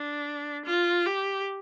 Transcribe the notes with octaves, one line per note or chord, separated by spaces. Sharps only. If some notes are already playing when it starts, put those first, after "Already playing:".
Already playing: D4
F4
G4